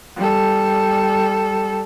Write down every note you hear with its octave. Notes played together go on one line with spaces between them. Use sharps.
G3 A4